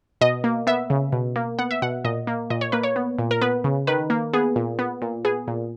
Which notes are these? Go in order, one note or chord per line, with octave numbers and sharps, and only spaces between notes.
B2 D#5
A#3
B3 E5
C#3
B2
A#3
B3 F#5
E5
B2 F#5
A#2 D#5
A#3
A#2 D#5
C#5
A#3 B4
C#5
B3
A#2
A#4
B3 B4
C#3
D#3 B4
A#3
B3 G#4
A#2
B3
A#2
B3 G#4
A#2